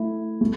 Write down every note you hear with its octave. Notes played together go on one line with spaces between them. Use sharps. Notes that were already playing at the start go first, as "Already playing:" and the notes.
Already playing: A3 E4
A3